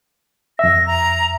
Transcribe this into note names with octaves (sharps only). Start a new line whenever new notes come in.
F2 E5 A#6
A#5